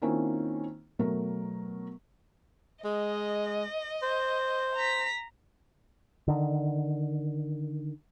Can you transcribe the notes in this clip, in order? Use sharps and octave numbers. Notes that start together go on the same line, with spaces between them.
D#3 A#3 C4 C#4 E4 F4
B2 F#3 A3 A#4
G#3 D#5
C5
A#5 B6
D3 D#3